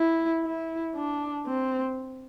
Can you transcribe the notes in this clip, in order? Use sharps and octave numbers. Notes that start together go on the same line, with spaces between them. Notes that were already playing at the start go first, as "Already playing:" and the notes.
Already playing: E4
E4
D4
C4